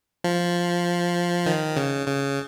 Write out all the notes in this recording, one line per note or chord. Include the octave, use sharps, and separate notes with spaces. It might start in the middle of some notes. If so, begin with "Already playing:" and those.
F3
D#3
C#3
C#3